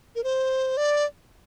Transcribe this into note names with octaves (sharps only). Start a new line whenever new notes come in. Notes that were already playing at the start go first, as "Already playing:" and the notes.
A#4
C5
D5